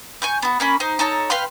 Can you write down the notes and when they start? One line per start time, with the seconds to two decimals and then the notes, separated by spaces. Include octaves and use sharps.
0.22 G#5 C#6 G6
0.42 B3 F#4
0.60 A#3 C#4 B5
0.80 D#4 C5
0.99 D#4 A4 C#5 A#5
1.30 B4 F5 G5 C6